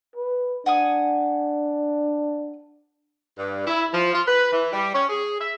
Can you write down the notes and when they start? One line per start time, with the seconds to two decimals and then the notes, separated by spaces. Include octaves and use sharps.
0.16 B4
0.66 D4 F#5 G#5 D#6
3.37 G2
3.67 E4
3.93 F3
4.13 F4
4.27 B4
4.51 E3
4.73 G3
4.94 C#4
5.09 G#4
5.39 E5